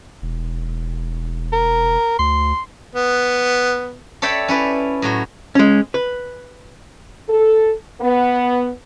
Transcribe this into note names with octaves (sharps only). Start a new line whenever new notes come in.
E1
A#4
D2 C6
B3
A4 C#5 D5 E5 G5 B5
C#4 E4 B4 D5
A2 F#3 F#4
G#3 C#4
B4
A4
B3